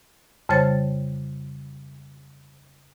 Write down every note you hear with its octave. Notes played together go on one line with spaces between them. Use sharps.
F2 C#3 G3 C5 C#5 A6